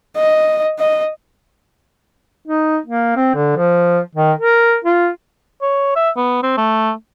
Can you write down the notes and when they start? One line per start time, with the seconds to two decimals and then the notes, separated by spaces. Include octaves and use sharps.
0.16 D#5
0.79 D#5
2.48 D#4
2.86 A#3
3.16 C4
3.35 D3
3.56 F3
4.15 D#3
4.39 A#4
4.84 F4
5.62 C#5
5.96 E5
6.16 B3
6.43 C4
6.57 A3